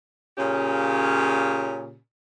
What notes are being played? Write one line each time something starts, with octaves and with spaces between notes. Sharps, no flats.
A#2 C#3 C#4 G4